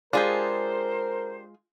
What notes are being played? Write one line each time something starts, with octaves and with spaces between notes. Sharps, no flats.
G#3 D4 F4 G4 G#4 A#4 C5